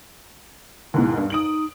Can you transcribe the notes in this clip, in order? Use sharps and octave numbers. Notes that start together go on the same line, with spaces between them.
D#2 G#2 B2 E4
G2 D4
D#4 D#6 D7 F#7